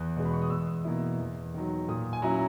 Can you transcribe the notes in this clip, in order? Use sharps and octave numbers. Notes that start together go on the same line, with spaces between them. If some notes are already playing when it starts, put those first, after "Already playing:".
Already playing: E2 F#6
B2 G#3
B5
C#6
D#6
E2 E6
B2 A#3 E4
E2
D#3 F#3
A#2 D#6
G#5
F#3 C#4 E4 A#5